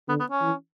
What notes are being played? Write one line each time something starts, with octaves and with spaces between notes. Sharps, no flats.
D3 B3
B3
C#4
E3